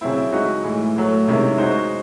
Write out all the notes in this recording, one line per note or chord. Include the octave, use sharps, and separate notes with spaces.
C#3 F#3 C4 E4
G#3 D#4 F#4
A2 E3 G#3
A2 F#3 A3
C3 D#3 G#3 C#4 E4
G#3 D#4 F#4 C5